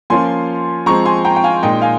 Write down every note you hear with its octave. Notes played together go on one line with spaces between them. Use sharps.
F3 A#3 C#4 F4 G#5 C6
F3 G#3 C4 A#5 C#6
G#5 C6
G5 A#5
G5
F5 G#5
A#2 G#3 D#4 D#5 G5
F5 G#5